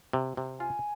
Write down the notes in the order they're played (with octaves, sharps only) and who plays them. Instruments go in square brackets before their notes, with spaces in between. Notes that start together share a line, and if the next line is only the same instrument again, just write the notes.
[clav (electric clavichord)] C3
C3
[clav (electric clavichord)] F4 [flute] G#5